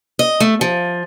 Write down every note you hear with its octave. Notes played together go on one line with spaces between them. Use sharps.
D#5
A3
F3